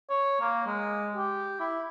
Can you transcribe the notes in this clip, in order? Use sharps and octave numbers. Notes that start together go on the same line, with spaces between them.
C#5
A#3
G#3
G4
E4